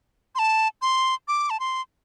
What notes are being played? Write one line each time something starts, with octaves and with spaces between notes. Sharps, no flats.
C6
A5
C6
D6
A5
C6